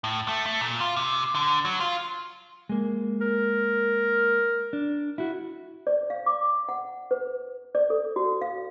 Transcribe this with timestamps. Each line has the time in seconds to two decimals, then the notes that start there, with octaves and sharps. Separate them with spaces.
0.04 A2
0.28 A3
0.46 A3
0.61 A#2
0.80 F4
0.96 C3
1.35 D3
1.65 F#3
1.80 F4
2.69 G#3 A#3
3.21 A#4
4.73 D4
5.18 E4 F#4
5.87 D5
6.10 F5
6.26 D6
6.69 F#5
7.11 B4
7.75 D5
7.90 A4
8.16 F#4
8.42 F5